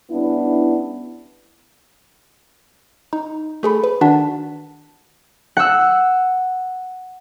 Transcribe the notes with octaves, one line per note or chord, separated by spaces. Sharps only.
G2 B3 C#4 D4 E4
D#4
A3 G#4 A4 B5
B4
D#3 D4 F#4 F#5 A5 B6
F#5 E6